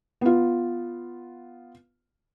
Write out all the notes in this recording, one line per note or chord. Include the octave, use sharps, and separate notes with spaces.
B3 F4